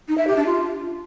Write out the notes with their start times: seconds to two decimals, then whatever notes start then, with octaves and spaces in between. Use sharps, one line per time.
0.08 D#4
0.18 E5
0.27 G4
0.37 D4
0.46 F4